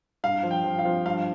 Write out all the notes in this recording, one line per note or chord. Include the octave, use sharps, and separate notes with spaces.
G2 F5
F3
G5
F3
F5
F3
G2 F5